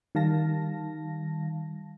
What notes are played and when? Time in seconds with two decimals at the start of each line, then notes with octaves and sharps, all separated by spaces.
0.15 D#3 G3 F5 A5 A#6